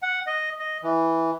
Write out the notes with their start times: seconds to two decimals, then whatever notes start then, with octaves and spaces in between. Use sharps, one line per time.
0.02 F#5
0.27 D#5
0.59 D#5
0.83 E3